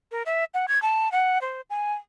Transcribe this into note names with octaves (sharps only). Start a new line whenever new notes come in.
A#4
E5
F#5
G#6
A5
F#5
C5
G#5